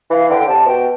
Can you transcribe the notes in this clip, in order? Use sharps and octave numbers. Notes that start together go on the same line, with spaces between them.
E3 F5
D3 G5
D3
C3 A5
B2 G5